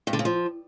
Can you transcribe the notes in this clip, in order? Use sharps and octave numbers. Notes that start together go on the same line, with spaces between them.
G2
D3
C#3
F3